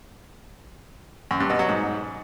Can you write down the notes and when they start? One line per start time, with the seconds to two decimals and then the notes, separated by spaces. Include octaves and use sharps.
1.31 F#2
1.40 G2
1.50 B2
1.59 F#3
1.69 G#2